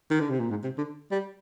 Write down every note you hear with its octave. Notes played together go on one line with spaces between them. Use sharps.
D#3
D3
C3
A#2
G#2
C3
D3
G3